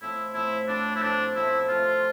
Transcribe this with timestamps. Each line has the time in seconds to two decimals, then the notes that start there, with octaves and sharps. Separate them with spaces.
0.01 A2 F3 C4 E4
0.34 A2 F3 C4 E4
0.68 A2 F3 C4 D4
0.96 E4
1.02 A2 F3 C4 D4
1.35 C3 F3 A3 C4 E4
1.69 C3 F3 A3 C4 F4